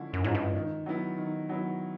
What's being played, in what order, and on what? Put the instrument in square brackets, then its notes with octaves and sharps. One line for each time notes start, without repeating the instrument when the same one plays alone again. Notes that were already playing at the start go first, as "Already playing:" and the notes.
Already playing: [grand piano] D3 F3 G#3 C#4 E4
[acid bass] F#2
[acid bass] G#2 [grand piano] F3 G#3 C#4 E4
[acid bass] G2
[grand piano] D#3
F#3 B3 E4
D#3
F#3 B3 E4